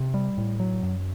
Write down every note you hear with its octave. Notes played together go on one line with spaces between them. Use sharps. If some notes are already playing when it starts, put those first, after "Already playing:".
Already playing: C3
G3
A2
F#3
F#2